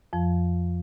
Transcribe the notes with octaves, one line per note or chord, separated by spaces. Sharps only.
F2 F3